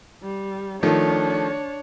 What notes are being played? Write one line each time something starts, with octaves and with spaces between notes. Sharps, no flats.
G3
D#3 F3 A3 D4 C#5